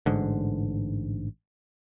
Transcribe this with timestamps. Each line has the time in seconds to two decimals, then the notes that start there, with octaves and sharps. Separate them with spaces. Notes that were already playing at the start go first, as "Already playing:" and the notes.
0.06 A1 G#2 D3